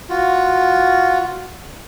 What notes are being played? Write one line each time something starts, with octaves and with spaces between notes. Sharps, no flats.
F4 F#4